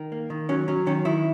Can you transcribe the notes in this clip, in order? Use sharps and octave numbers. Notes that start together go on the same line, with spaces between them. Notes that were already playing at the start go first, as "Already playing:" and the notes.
Already playing: D#3
A#3
D#3
F#3 C#4
F#3 C#4
D#3 C#4
D#3 E4